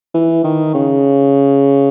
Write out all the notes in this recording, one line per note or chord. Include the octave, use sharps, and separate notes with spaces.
E3
D#3
C#3